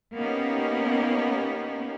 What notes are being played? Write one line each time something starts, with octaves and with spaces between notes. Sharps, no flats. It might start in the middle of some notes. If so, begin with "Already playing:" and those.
A#3 B3 C#4 D#4 G4